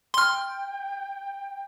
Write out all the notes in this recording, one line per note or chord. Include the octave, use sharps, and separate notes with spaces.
G5 C6 F6